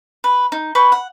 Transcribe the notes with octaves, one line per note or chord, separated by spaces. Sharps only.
B4
D#4
B4 F#5 G5 C#6
F#5